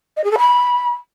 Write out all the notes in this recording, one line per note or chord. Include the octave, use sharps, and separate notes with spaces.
D#5
G#4
A4
B5